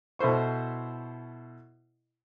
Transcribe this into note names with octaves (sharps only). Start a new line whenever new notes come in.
B2 E4 A4 C5 C#6